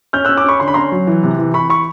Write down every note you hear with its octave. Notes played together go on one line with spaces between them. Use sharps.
C#4 F6 G6
E6 F#6
C#4
D6 E6
C#4 B5 C#6
D3 C6
B5
C#4 A#5 C6
F#3
E3
C3
E3
E3 B5 C#6
B5 C#6